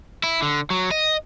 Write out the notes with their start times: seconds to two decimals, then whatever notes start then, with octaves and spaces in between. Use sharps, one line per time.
0.24 E4
0.42 D3
0.70 F#3
0.91 D#5